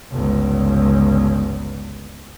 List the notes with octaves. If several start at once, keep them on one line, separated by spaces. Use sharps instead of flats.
G1 C#2